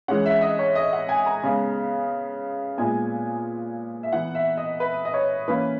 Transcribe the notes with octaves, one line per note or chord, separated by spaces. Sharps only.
E3 G#3 C#4 F#5
E5
D#5
C#5
D#5
F#5
G#5
A#5
C#3 G#3 B3
A#2 G#3 B3 G#5
E5
E3 B3 F#5
E5
D#5
B4
D#5
C#5
E3 A#3 C#4 B4